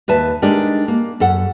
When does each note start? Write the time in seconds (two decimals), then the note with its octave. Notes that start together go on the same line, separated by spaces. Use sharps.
0.08 D#2 B4 E5 A5
0.42 G#3 D4 D#4 G4 A4 A#4
0.88 A#3
1.20 F#2 A4 F#5